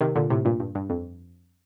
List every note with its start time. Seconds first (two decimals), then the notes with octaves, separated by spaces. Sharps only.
0.01 C3 D#3
0.15 A#2 D3
0.30 A2 C3
0.45 G2 A#2
0.60 G2
0.75 G2
0.90 F2